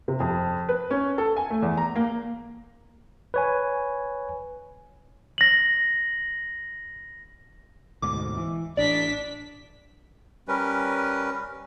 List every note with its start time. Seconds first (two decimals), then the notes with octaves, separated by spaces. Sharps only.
0.08 C3
0.20 F2
0.69 B4
0.91 C#4
1.18 A4
1.37 G#5
1.50 A3
1.62 E2
1.77 A#5
1.96 A#3
3.34 B4 C#5 G#5
5.38 A#6 F#7
8.02 D2 G#2 B2 D6
8.37 E3
8.77 A1 D4 D5 B6
10.48 G3 C#4 A#4 B4